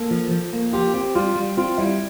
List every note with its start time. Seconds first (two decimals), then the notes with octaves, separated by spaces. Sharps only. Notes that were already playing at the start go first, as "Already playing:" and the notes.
Already playing: A#3 A4
0.11 F3
0.31 F3
0.53 A#3
0.73 F4 G4
0.94 C4 G4
1.15 G3 F4
1.36 G3
1.57 C4 F4
1.78 G3 E4